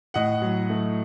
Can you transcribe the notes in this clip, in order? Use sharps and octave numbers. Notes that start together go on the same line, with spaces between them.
A2 D#5 F#5
F#3
A3